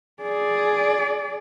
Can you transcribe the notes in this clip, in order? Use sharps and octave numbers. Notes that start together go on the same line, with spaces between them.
G#4 D5